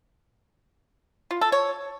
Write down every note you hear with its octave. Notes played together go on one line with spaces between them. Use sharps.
F4
A4
C#5